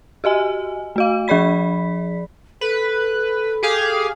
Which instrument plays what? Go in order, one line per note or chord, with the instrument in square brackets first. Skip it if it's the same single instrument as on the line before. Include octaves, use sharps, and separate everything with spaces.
[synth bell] F#4 G4 D#5 G#5
A3 F#4 F5
F3 G#4 D5 B5 B6
[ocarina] A4 [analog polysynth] B4
[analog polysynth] G4 G#4 F5